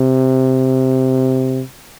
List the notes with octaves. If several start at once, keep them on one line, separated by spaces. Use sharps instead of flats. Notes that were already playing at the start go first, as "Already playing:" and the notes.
Already playing: C3